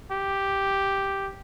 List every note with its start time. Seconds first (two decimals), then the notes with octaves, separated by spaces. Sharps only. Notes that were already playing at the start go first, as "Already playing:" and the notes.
0.11 G4